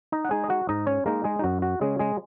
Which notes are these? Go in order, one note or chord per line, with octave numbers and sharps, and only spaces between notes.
D#4 D#5
F#5
G#3 D#4 G#4 G#5
D#5
F#4 F#5
G#2 D#4 D#5
C#4 C#5
G#3 A#3 D#4 A#4
G#3 G#4
D#4
F#2 F#4
F#4
C#3 G#3 C#4 G#4
G#3 G#4